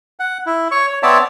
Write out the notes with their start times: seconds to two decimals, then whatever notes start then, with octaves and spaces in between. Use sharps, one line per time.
0.19 F#5
0.46 E4
0.71 C#5 C#6
0.88 C#5
1.03 B3 C4 C#5 D5 E5 A5